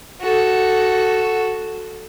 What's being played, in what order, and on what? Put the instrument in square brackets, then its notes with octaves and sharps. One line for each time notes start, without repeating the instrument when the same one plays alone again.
[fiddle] F#4 A4